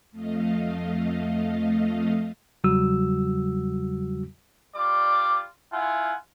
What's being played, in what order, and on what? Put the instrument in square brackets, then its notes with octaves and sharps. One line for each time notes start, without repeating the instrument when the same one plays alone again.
[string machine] F2 A3 D#5 F5
[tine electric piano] E2 C#3 F#3 G3 F#4 E6
[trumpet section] G3 F4 D5 D6
E4 F4 F#5 G#5